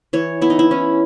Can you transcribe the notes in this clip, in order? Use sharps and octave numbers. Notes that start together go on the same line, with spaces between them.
E3 C#5
B3 E4
D#4
E4
C#4